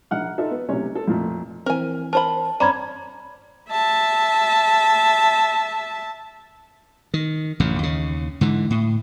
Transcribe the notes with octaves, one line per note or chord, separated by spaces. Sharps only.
A#1 F#5 F6
D#4 F4 A4 E5
B3
B1 C3 A3 C#4 C#5
A4
F2 A#2 A3
E3 C4 A#4 G#5
A#4 C5 A5 B5
G2 C4 C#4 D5 A#5 B5 G#6
E5 A5
D#3
A1 F#2 C#3
D#2 C#3
G#2 D3 E3
A2